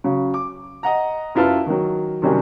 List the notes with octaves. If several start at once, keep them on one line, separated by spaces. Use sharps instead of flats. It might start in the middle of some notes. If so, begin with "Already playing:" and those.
C#3 F#3
D6
D#5 F#5 A#5
F#2 E4 F4 B4 A5 F6
D#3 F#3
C3 D#3 F#3 G3 C#4 D4